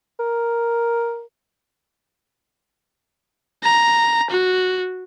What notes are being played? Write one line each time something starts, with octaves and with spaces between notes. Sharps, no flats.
A#4
A#5
F#4